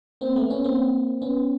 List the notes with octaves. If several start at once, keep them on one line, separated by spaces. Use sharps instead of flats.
A#3 C4
A3 B3
B3 C#4
A#3 C4
B3 C#4